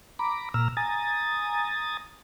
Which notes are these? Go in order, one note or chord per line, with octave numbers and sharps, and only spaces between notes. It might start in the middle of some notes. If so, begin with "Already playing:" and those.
A#5 B5 D6
A#2 A#5 E6 F6
G#5 A#5 D#6 A6